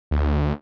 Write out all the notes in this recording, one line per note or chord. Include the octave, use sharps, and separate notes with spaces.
D2